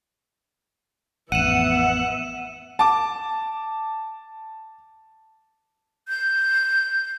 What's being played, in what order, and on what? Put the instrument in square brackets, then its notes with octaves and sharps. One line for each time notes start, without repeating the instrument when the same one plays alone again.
[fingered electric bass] A1 F2 [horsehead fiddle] B3 E5 [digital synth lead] F#5 [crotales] D#7 E7
[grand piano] A5 D6
[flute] G6